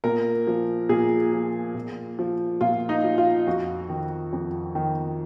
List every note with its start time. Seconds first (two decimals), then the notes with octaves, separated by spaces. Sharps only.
0.04 A#2 A#4
0.47 F3
0.89 A#2 G#4
1.33 F3
1.75 A#2
2.19 F3
2.61 A#2 F4
2.89 D#4
3.04 F3
3.18 F4
3.47 F2 F#4
3.89 D#3
4.33 F2
4.75 D#3